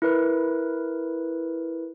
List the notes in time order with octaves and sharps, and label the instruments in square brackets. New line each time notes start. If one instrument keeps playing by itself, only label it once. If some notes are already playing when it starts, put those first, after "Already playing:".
[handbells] E4 A#4 B4